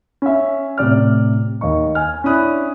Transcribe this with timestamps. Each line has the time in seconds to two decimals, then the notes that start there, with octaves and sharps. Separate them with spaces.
0.22 C#4 E5
0.78 A2 C3 D5 F6
1.61 D#2 D#5 C#6
1.95 G#5 F6
2.24 C#4 D4 E4 D#6 F#6